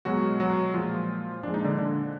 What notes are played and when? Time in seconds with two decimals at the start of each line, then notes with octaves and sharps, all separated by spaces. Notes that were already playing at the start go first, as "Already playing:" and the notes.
0.05 B2 F#3 G#3 F#4
0.40 F#3 F#4
0.74 A#2 F3 G#3 F4
1.43 A#2 F3 G#3 D4
1.54 D#4
1.64 D3 D4
1.78 D3 D4